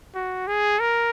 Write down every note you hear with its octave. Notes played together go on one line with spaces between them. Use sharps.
F#4
G#4
A#4